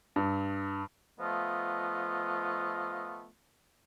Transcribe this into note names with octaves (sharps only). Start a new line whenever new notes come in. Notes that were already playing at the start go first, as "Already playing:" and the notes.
G2
F3 A3 B3 F4 D#5